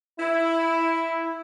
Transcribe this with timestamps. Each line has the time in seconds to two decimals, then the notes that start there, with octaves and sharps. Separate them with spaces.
0.19 E4